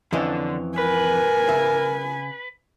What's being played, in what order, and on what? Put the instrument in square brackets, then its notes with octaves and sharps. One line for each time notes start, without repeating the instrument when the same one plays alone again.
[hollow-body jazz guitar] F2 E3 C#4 [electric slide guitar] D3
[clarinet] A#4 [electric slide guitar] B4 [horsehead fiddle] G#5
[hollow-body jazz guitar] C#3 E5